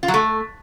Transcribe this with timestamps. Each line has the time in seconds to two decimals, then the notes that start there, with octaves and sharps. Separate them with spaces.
0.03 F4
0.08 F#3
0.14 A3